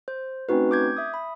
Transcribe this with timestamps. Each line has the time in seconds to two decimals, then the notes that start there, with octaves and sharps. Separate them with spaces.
0.08 C5
0.49 A3 C4 C#4 D#4 F#4 B4
0.71 D6 G6 G#6
0.97 E5 D#6
1.14 B5